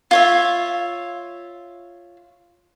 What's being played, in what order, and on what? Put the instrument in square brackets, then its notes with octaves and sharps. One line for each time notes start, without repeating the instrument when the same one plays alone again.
[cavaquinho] F4 C#5 E5